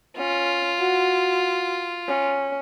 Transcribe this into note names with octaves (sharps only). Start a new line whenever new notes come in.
C#4 F4
F#4
C#4